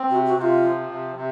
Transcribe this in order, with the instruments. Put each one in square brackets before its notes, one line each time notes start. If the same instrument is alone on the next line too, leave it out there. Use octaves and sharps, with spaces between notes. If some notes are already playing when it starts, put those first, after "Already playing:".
Already playing: [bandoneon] C4
[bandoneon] C3 [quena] F#4
[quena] F#4
[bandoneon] C3 [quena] F4 F#4
[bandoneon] F3
C3
C3